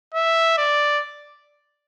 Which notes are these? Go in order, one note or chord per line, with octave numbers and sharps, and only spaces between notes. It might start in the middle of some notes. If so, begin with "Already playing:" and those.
E5
D5